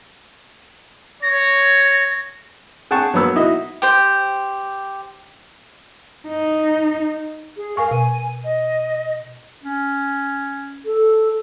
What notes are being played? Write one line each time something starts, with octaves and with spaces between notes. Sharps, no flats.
C#5 A#6
G#4 F#5 G5 A5 C#6
F#3 A#3 B3 E6
D#4 E4 F#4 D#5
G4 C5 G5
D#4
G#4
A#4 F5 G#5 C#6
B2 G#5
D#5
C#4
A4